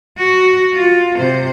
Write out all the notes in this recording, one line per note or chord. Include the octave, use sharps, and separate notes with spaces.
F#4
F4
C3 C5